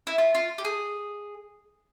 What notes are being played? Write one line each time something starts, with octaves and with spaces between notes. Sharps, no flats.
E4
F4
F4
G4
G#4